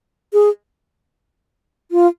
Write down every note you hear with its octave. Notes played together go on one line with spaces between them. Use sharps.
G#4
F4